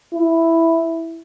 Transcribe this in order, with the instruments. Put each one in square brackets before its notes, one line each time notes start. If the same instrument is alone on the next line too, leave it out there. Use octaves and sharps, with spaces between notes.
[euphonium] E4